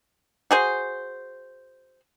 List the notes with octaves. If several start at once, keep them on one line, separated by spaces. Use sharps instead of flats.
F#4 G#4 C5